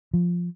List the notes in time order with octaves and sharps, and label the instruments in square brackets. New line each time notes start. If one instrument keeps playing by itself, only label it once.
[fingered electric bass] F3